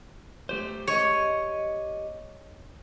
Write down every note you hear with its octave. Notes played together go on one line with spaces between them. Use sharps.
A3 G4 C5
G4 C#5 D#5